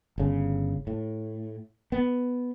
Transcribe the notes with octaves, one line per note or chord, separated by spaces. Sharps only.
G1 C#3
A2
B3